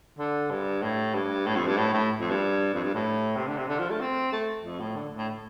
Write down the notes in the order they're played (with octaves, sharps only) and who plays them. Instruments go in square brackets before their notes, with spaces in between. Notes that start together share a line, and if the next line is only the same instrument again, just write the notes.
[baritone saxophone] D3
G2
A2
G2
A2
F2
G2
A2
A2
F2
G2
F2
G2
A2
C3
D3
C3
D3
F3
A3
C4
A3
F2
A2
D3
A2